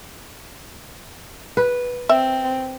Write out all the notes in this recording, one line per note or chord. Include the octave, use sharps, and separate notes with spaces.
B4
C4 E5